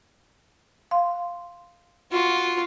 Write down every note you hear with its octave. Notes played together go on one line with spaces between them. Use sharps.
F5 C6
F4 F#4